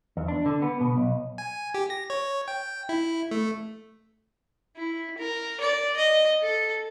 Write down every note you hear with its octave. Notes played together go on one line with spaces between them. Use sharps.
E2
D4
D3
B3
B2
B1
G#5
G4
A#6
C#5
G5
E4
A3
E4
A#4
D5
D#5
A4